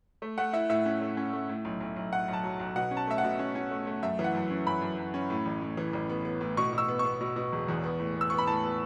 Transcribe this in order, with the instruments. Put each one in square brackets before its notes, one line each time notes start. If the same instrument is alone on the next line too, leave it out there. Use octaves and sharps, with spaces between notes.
[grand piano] A3
A3 F#5
E4 E5
A2 E5
C#4
A3
C#4
A3
A2
B1
B1
B1
A2 F#5
B1 A5
F#3
B1
B2 F#5
C#4
A5
A3 E5
F#5
B2
C#4
C#4
A3
A3
F#2 E5
E3
F#5
F#2
C#4
F#2 B5
F#2
F#2
C#4
A2
A1
A2
E3
A1
B3
B3
A2
B2 C#6
B2
E6
B3
C#6
B3
B2
B2
E1
E2
B3
A2
B3
E6
B3 C#6
B5
A2 A5
B3